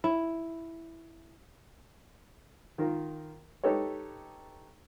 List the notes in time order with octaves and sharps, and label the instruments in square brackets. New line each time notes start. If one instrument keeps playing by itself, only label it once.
[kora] E4
[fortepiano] D#3 F4 A#4
D#4 G4 A4 B4 C#5